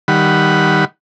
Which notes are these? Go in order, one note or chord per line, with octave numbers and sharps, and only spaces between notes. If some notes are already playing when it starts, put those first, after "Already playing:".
D#3 G3 F#5 B5